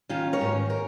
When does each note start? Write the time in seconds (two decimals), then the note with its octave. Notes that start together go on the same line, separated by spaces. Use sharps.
0.09 D#3 C#4 F4
0.33 A#4 C#5
0.41 G#2
0.70 A#4